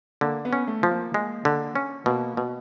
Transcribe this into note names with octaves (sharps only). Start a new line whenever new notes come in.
D3 A#3
B3
C#4
A3
F3
A#3
G#3
D3
C#4
B2 A#3
B2